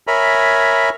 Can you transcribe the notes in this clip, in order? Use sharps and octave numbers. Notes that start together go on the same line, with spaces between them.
A#4 C#5 E5 G#5 A#5 B5